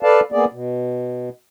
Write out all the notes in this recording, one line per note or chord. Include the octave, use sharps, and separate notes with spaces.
A4 B4 D5 F5 A5
A#3 B3 G#4 D5
B2